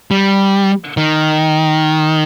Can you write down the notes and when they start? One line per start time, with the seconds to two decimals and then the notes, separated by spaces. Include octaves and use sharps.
0.11 G3
0.97 D#3